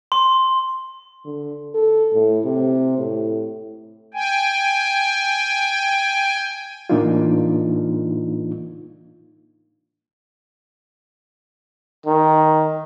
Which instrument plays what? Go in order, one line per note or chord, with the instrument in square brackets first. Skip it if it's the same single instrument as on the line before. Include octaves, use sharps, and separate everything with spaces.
[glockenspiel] C6
[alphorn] D3
A4
A2
C3
A2
[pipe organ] G5 G#5
[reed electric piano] A2 E3 A#3 D4 D#4 F4
[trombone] D#3